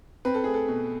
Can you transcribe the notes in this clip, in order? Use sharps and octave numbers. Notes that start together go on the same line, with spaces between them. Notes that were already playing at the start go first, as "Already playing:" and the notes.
C4 B4
A4
A3 G#4
A4
B2